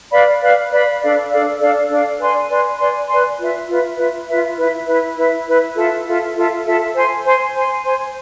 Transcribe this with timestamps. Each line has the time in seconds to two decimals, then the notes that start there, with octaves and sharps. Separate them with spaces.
0.12 B4 D5 F5 B5
0.41 B4 D5 F5 B5
0.71 B4 D5 F5 B5
1.01 D4 A4 D5 F5
1.31 D4 A4 D5 F5
1.60 D4 A4 D5 F5
1.90 D4 A4 D5 F5
2.19 B4 D5 G#5 C6
2.49 B4 D5 G#5 C6
2.79 B4 D5 G#5 C6
3.09 B4 D5 G#5 C6
3.38 F4 B4 E5
3.68 F4 B4 E5
3.97 F4 B4 E5
4.28 F4 B4 E5
4.57 E4 B4 E5
4.87 E4 B4 E5
5.16 E4 B4 E5
5.46 E4 B4 E5
5.76 F4 A4 E5
6.06 F4 A4 E5
6.35 F4 A4 E5
6.65 F4 A4 E5
6.95 C5 G#5 C6
7.25 C5 G#5 C6
7.54 C5 G#5 C6
7.84 C5 G#5 C6